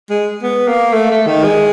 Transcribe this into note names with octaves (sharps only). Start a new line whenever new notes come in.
G#3
B3
A#3
A3
A3
D#3
G#3